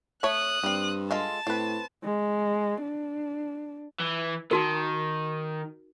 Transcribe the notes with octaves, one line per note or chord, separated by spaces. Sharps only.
A3 C#5 D#6 F#6
G2 G3 C4
G#3 F4 A4 A5
A2 C4 B4
G#3
D4
E3
D#3 D#4 F#4 A#4